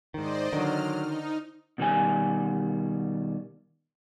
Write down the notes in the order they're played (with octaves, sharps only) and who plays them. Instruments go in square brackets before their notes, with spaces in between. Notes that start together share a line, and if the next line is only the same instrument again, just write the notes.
[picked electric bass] G#2 D#3 [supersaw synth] C5 D5 D#5
[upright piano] D3 [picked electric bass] D#3 [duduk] F#3 [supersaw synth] F6
[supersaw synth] D#4
[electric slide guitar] B2 D#3 G3 G#5